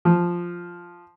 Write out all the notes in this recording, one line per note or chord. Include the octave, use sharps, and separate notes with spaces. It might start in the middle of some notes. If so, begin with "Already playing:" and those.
F3